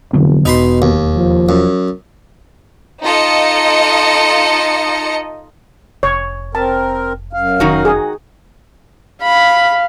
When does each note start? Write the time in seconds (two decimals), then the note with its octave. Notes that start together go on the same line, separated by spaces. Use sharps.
0.13 F1 D3 F#3 B3
0.45 E1 B2 D#4 B5 C6
0.82 D#2
1.17 F3
1.49 F#2
3.03 D#4 F4 A4 D#5 C#7
6.03 F1 C#5
6.55 C4 A#4 A5
7.33 F#2 F5
7.60 F1 D#3 D#4 F#4
7.85 G#4
9.23 F5 B5